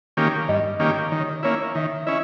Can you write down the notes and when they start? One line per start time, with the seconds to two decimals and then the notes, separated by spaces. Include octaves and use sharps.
0.17 D#3 A#3 C#4 G4
0.48 G2 D#5
0.79 D#3 A#3 C#4 G4
1.12 D#3 D#5
1.20 C#5
1.28 D#5
1.43 A#3 C#4 E4 C#5
1.75 D#3 E5
2.07 C#4 E4 D#5